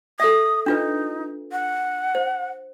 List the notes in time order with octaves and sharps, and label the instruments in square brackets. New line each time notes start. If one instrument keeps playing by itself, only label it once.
[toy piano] A4 E5 [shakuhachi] D#6
[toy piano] D4 F4 B4 [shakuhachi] D#4
[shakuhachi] F#5
[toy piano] C5